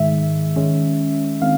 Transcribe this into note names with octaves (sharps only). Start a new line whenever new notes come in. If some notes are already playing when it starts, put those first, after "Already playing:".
Already playing: G#2 D#3 G#3 E5
D#3 G#3 C#4
D#3 G#3 C4 F5